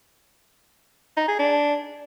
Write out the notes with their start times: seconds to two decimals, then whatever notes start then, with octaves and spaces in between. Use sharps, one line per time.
1.17 D#4
1.28 G#4
1.39 D4